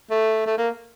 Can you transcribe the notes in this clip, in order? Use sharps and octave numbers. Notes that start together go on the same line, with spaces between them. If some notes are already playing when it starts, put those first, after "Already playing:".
A3
A3
A#3